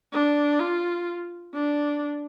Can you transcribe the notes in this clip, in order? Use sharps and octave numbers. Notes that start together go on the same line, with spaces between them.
D4
F4
D4